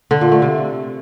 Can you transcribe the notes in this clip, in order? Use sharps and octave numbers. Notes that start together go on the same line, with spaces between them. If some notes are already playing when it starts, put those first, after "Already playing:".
D3
A#2
A3
C3